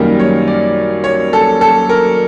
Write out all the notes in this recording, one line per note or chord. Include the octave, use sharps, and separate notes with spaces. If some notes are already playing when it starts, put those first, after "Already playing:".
Already playing: F#2 D#3 G3 A#3
C#5
D5
C#5
A4
A4
A#4